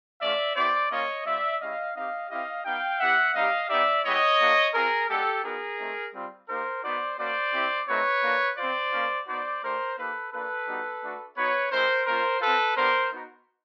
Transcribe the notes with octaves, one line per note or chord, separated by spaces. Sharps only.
A3 C#4 F4 D5 E5
B3 E4 G4 C5 D5
A#3 C#4 F4 C#5 D#5
G3 C4 F4 D5 E5
G#3 C#4 E4 G4 D#5 F5
C4 D#4 G4 D#5 F5
C4 E4 G4 D#5 F5
B3 D#4 G4 F5 G5
B3 E4 G4 E5 F#5
G3 C4 D#4 G4 D#5 F5
B3 D#4 G4 D5 E5
G#3 B3 E4 G4 C#5 D#5
A#3 D4 F#4
C4 F4 G#4 A#4
G#3 B3 D4 G4 A4
B3 D#4 F#4 G#4 A#4
A3 C4 D#4
G3 C4 F4
A#3 D#4 G4 A#4 C5
B3 D#4 F#4 C5 D5
A#3 C#4 F#4 C5 D5
C4 E4 G4
A3 C4 D#4 F#4 B4 C#5
A#3 D4 F#4
C4 F4 C5 D5
A#3 C#4 F4
B3 D#4 F#4 C5 D5
A3 D4 G4 A#4 C5
A#3 D#4 G4 A4 B4
A#3 D4 F4 A4 B4
G3 B3 D#4 F#4
A3 D4 F#4
B3 D#4 F#4 B4 C#5
G#3 C4 E4 G4 A#4 C5
A#3 C#4 F4 A#4 C5
C4 F4 A4 B4
B3 D4 G4 A#4 C5
B3 D#4 F#4